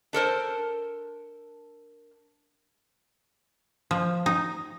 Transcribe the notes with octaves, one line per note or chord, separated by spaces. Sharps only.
D4 A4 A#4 C5
F3
D#4